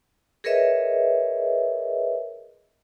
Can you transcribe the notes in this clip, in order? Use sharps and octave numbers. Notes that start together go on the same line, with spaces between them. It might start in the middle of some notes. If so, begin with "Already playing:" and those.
G#4 A#4 B4 C#5 D#5 E5